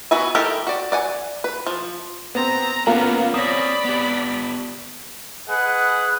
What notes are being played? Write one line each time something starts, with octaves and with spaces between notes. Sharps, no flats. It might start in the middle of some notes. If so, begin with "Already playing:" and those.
B3 F#4 B4 E5 G#5
D#4 E4 G4 A4 A#4
F#4 D5
D5 F#5 G#5
B4
F3
B3 C4 A#5
A#3 B3 C#4 F4 B4 A#5
C4 C#5 D5 B5 D#6 A#6
B3 G4
G#4 B4 D#5 F#5